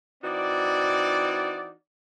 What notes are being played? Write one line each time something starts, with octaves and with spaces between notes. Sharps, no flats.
E3 C4 D#4 F#4 D5